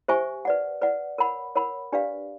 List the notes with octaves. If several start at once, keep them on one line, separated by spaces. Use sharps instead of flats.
G4 C5 E5 G#5 C#6
B4 D5 F#5
B4 D5 F#5
A#4 C#5 F#5 B5
A#4 C#5 F#5 B5
D4 G4 B4 D5 F5